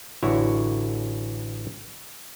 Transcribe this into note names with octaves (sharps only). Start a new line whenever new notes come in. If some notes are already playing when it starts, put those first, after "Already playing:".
A1 D3 E4 F#4 C#5